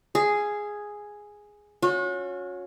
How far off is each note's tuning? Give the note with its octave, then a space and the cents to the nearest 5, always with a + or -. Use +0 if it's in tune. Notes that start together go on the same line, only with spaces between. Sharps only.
G#4 +0 E5 +45
C#4 +0 F#4 -40